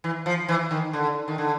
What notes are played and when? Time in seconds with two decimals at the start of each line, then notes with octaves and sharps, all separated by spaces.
0.04 E3
0.26 F3
0.48 E3
0.71 D#3
0.93 D3
1.28 D#3
1.38 D3